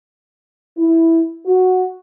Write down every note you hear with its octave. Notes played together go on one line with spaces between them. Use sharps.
E4
F#4